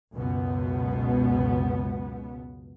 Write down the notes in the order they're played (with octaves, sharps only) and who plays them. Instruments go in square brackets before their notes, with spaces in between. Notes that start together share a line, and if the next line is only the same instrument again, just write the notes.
[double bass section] C#2 F#2 B2 B3